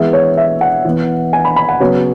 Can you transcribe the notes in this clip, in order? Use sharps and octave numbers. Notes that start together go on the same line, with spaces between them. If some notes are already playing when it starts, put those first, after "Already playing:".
Already playing: E3 G#3 B3 E5
C#5
E5
F#5
E3 B3
G#5
B5
B5
F#5
C#3 F#3 B3 C#5